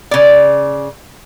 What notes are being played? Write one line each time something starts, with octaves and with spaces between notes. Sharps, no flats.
C#3 D5